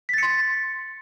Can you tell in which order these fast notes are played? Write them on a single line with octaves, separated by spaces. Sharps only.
B6 A6 C#7 C6